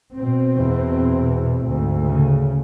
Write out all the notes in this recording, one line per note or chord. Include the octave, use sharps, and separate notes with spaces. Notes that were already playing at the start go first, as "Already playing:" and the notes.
B2 C4
E2
D2 G#2
C#3